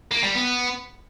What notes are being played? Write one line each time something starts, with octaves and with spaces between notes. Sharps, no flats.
A#3
G3
B3